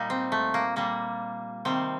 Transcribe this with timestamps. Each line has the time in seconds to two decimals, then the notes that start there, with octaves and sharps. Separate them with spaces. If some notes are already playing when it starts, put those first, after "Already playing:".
Already playing: A#2 G3 D#4
0.10 C4
0.32 A3
0.54 A#3
0.76 A#2 G3 A#3
1.65 C3 D#3 G3 C4